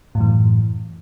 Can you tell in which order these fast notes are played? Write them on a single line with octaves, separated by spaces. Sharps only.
A2 F#2 E3